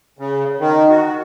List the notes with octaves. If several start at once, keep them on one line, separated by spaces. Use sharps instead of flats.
C#3
D#3
F#4